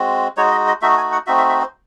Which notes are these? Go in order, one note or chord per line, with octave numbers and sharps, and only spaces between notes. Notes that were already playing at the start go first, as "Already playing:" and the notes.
Already playing: G#3 C4 F#4
G#3 D#4 F#4 C#5
D#5
D#5
A3 D#4 F#4 E5
G#5
F#5
A3 C4 D#4 F#4 E5
E5
E5
C5